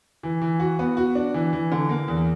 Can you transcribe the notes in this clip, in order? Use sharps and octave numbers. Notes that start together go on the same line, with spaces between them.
E3
E3
F#4
B3
F#4
D4
E3
E3
D3
A#3
E2